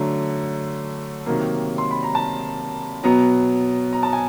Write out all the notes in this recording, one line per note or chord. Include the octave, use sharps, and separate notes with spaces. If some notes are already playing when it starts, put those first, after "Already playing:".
Already playing: D3 F#3 A3 A#5
C3 D#3 F#3 A#3
C6
B5
A#5
A5
B2 F#3 B3 A#5
A#5
A5
G#5